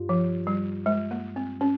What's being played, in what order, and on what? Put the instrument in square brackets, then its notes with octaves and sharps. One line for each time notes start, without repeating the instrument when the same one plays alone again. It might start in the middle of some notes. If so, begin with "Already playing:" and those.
Already playing: [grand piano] G2 G3 F4
[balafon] F3
G3
G#3
A#3
C4
C#4